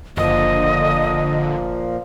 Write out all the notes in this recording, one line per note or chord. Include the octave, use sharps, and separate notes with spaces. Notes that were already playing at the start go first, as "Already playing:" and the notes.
F#1 A#2 D3 F3 A#3 D#5